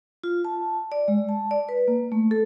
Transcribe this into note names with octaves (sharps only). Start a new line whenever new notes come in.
F4
A5
D5
G#3
A5
D5
B4
A#3
A3
A4